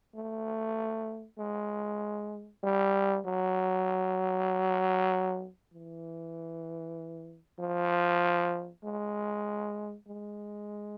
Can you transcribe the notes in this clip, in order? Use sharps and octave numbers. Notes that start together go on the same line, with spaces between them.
A3
G#3
G3
F#3
E3
F3
G#3
G#3